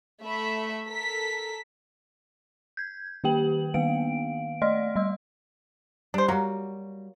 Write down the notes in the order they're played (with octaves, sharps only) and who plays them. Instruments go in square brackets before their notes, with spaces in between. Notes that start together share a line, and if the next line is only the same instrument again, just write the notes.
[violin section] A3 E5 B5
A4 A#4 B6
[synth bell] G6 G#6
D#3 A#3 G4 G5 F#7
D#3 A#3 B3 F5 D7
A3 D5 D#5 C6 F6
G3 C6 E6
[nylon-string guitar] G3 [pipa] D4 C5
[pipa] F#3 A#3 [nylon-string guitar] G3 F#4